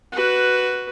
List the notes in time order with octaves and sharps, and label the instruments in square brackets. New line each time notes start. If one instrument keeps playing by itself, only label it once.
[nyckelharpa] F#4 B4